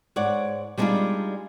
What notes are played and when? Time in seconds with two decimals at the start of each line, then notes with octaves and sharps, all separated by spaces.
0.16 G#2 C#5 D5 F#5
0.78 G3 G#3 B3 D4 D#4 F4